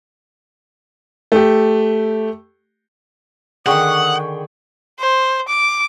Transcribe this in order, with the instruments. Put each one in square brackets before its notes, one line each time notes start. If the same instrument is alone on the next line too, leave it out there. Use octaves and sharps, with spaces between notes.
[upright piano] A3 G4
[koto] D3 D#3 [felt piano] G#4 G5 C#6 [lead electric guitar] F#5 [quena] D#6
[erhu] C5
D6